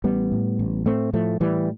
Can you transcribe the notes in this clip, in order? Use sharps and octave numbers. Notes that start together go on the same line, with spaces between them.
A1 G3 B3
A2
A1
A2 A3 C4
A2 F3 A3
A2 E3 G3